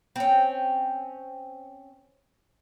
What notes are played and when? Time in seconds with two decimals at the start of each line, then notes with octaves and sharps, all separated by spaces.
0.16 C4 C#4